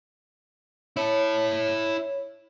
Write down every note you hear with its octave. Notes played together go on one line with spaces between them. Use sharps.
E4 C#5 A5